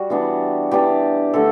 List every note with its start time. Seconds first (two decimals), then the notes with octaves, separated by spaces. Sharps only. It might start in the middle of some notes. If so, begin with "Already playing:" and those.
Already playing: G3 F#4
0.10 E3 B3 D4
0.71 E3 B3 D4 G4
1.34 D3 A3 A4